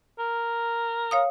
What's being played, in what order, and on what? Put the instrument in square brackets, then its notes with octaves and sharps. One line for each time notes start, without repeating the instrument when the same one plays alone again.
[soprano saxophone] A#4
[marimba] C#5 F5 D#6